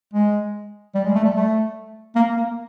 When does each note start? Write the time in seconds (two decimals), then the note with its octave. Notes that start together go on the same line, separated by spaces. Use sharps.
0.14 G#3
0.95 G3
1.05 G#3
1.14 A3
1.24 G3
1.35 A3
2.16 A#3
2.36 A#3